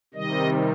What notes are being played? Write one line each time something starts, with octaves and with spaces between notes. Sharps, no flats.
C3 D#3 G3 D#5